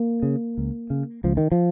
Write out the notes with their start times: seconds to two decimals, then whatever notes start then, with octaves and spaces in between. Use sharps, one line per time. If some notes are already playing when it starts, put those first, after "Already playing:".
Already playing: A#3
0.23 C#3
0.58 C#2
0.90 C#3
1.24 C#2 F3
1.37 D#3
1.52 F3